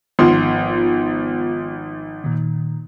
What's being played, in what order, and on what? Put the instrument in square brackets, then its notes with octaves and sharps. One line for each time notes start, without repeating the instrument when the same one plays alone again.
[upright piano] G#1 F3 C6 [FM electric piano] B3 F4
[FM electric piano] A#2 D#3